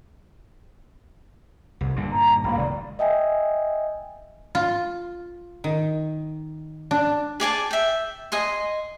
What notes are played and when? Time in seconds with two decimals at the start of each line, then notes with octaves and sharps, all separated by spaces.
1.81 C2
1.96 G2 A#2 D3
2.10 A#5
2.44 G#1 A#3 F5 G5 B5
2.55 F1 C#2 D5
2.99 D#5 E5 G5 G#5
4.55 F4
5.64 D#3
6.91 D4
7.40 G#4 D5 G#5 A5
7.71 E5 G5
8.32 D#5 G#5 C6